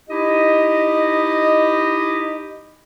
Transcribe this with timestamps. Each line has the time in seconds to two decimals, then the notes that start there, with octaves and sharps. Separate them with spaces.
0.08 D#4 E4 G4 D#5